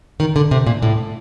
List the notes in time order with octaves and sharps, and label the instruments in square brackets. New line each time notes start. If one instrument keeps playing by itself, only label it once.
[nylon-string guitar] D#3
D3
C3
A#2
A2